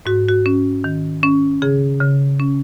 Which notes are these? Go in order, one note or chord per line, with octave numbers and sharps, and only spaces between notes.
G#2 F#4
F#4
C#4
D#3
C#4
C#3 G#4
C#3
C#4